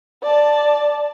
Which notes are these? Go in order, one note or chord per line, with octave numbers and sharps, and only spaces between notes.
D5 A5